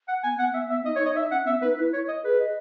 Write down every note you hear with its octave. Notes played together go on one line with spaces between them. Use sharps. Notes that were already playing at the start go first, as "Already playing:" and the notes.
F#5
B3 G#5
B3 F#5
B3 E5
B3 E5
D#4 D#5
C#5
D#4
D#5
D#4 E5
C#4 F#5
B3 E5
D#4 B4
E4 B4
C#5
D#5
G#4 B4
D#5